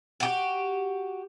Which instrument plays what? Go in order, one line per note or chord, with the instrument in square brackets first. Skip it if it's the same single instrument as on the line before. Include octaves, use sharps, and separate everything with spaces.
[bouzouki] F#4 G4